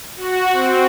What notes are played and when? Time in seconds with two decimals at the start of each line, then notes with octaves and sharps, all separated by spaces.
0.16 F#4
0.53 C4